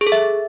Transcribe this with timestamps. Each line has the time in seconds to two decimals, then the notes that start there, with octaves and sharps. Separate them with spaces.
0.01 G#4
0.07 A4
0.12 E5